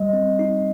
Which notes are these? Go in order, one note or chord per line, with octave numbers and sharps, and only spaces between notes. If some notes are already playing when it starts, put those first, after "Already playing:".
Already playing: G3 D#5
C4
D#4